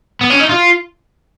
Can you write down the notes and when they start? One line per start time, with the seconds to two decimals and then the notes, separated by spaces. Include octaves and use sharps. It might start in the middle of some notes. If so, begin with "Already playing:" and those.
0.21 B3
0.30 C#4
0.40 D#4
0.49 F4